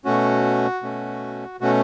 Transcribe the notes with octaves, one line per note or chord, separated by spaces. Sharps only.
B2 A3 C#4 F#4
B2 A3 C#4
B2 A3 C#4 F#4